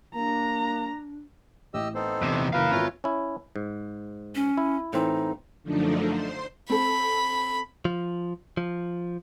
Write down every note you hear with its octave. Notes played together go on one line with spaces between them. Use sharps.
A#3 D4 A#5
A1 G4 D#5 E6
B3 C4 D#4 A4 C5
E2 C3
A#1 F#2 C#3 E3 A#4 B4 F5
G#1 B3 F4 F#4 C#5 E5 G#5
C#4 E4
G#2
C#4
E4
A2 E3 C4 D#4
F#2 D3 F3 A3 D4 D#4
C5 C6
C4 A4 B5
F3
F3